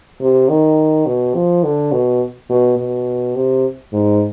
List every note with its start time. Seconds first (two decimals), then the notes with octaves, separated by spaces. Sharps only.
0.21 C3
0.49 D#3
1.06 B2
1.35 F3
1.64 D3
1.92 B2
2.49 B2
2.78 B2
3.35 C3
3.93 G#2